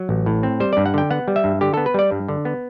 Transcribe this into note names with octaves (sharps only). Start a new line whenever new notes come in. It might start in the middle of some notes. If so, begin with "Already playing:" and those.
Already playing: F#3
A1
A2
C4
G3 C5
G2 D5
F#5
D3 G5
B3 F#5
G3
E5
G2
D3 G4
B3 A4
B4
G3 D5
G2
D3
B3